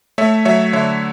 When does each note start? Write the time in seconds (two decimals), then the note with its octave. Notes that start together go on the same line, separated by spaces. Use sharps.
0.18 A3 C#5 E5
0.45 F#3 C#5 E5
0.73 D3 C#5 E5